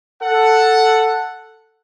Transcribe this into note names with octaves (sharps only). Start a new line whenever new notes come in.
A4 F#5